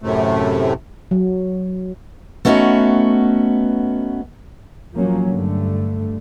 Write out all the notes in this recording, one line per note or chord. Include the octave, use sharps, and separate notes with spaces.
F#2 A2 C3 A3
F#3
A3 B3 C#4 D#4 F#4
F3 F#3 A#3 C#4
G2 D3 A3